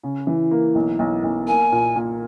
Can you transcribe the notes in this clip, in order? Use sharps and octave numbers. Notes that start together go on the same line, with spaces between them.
C#3
E3
A#3
B1
B1
B1
A#3 G#5
A#2
A#2